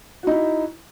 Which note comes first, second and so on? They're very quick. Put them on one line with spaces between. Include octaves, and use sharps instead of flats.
F#4 D#4 E4